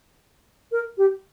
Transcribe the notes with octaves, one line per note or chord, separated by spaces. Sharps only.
A#4
G4